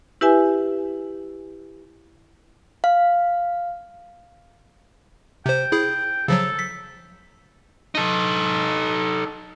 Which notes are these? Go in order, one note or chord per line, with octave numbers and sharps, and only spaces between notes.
E4 G4 B4 E5 G#5
F5
C3 C5 G5
E4 G#4
C#3 F3 F#3 A4
B6
D#4 A4